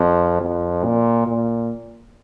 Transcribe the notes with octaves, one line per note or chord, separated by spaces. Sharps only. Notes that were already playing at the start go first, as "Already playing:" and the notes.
Already playing: F2
F2
A#2
A#2